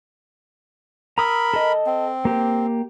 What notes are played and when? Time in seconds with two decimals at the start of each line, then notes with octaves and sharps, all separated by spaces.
1.18 A#4 A#5 B5 D#6 E6
1.54 A4 D#5
1.86 C4
2.25 A#3 G4